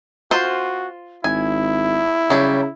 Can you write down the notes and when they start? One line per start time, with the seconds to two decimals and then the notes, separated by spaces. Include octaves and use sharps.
0.31 F4 F#4 C5
1.24 G#1 E4 G#5
2.30 C#3 F#3 G3